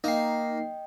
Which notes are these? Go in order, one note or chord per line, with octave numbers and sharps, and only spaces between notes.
A#3 D#4 D#5 G5 C7